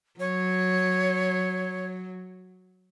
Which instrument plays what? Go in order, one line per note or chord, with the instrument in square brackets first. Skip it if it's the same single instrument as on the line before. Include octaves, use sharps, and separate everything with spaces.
[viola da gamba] F#3 [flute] C#5